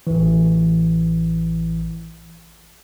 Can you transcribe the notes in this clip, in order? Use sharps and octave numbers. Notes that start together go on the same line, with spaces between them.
A1 E3